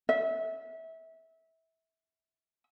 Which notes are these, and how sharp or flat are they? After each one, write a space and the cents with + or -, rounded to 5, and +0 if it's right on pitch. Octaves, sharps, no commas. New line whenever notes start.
E5 -25